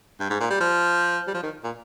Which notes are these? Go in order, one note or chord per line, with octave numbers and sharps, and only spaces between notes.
G2
G#2
A#2
G3
F3
G3
F3
D#3
A#2